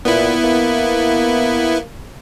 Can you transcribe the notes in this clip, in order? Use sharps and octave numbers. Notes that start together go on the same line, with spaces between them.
A#2 B3 E4
A#3